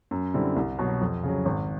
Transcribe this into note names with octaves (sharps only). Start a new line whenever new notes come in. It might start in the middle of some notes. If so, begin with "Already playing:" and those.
F#2
D3 G3 C4 E4
C2
B2 F#3
F2
C#3 F#3
G#1